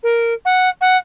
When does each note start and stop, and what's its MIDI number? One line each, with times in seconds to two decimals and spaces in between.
0.03 0.34 70
0.45 0.69 78
0.81 0.97 78